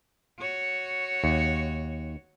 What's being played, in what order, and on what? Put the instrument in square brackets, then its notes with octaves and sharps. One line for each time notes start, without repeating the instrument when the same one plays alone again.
[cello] F#4 C#5
[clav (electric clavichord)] D#2